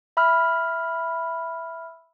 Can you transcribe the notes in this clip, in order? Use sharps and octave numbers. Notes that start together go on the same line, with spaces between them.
E5 B5 E6 F6